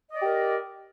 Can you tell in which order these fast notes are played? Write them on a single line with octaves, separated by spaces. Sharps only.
D#5 D5 G4 A#4